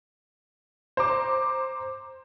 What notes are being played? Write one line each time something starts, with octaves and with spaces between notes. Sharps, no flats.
C5 A#5 D6